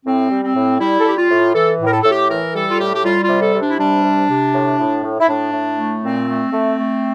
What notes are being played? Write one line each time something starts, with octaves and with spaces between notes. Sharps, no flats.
A2 C4
G3
C4
A2
G3 E4
A4
G3 G4
F4
A2
E3 A4
A2
A#4
A4
A2 A4
G4
E3 A#4
G3 A4
F4
A2 G4
G4
G3 F4
F4
C3
A4
C3
D4
E4
G3 D4
C3
C3
A2
A2
A2
E4
A2 D4
A2
A3
A#2 C4
A3
A3
A3